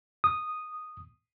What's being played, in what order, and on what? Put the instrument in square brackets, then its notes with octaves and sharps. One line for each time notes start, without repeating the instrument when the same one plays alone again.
[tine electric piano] D#6